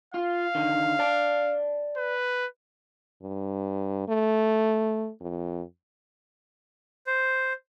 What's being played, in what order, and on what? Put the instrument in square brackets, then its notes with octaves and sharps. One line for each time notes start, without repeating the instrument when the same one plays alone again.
[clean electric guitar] F4 [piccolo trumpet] F5
[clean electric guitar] D3 D#3
D5 A5
[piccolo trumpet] B4
[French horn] G2
A3
F2
[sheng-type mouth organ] C5